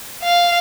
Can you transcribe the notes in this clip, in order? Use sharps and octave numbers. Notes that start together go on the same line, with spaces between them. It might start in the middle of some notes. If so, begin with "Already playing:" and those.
F5